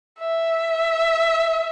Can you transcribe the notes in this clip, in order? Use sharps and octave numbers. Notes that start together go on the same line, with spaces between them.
E5